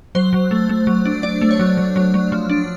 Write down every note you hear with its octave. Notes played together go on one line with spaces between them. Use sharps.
F#3 C5
F#3
A3
A3
F#3
D4
D4 D5
A3
C#5
F#3
F#3
F#3
F#3
F3
D4